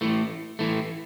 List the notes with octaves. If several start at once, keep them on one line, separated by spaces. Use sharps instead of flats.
A2 E3 A3
A2 E3 A3